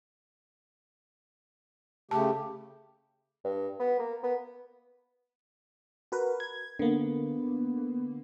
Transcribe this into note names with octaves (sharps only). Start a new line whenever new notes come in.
C#3 A3 G4 A5
G2
B3
A#3
B3
F#4 A#4 B4
G#6
D3 A#3 B3